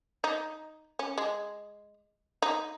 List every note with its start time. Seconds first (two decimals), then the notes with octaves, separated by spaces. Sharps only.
0.24 D#4
0.99 C#4
1.18 G#3
2.42 D#4